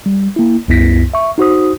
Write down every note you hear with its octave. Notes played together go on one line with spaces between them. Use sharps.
G3
A#3 E4
C2 F#2 B3 E4 A#6 B6
E5 C#6
D#4 F#4 C5 D#6